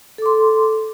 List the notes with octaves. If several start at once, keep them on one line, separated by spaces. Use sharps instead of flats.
A4 C6 D6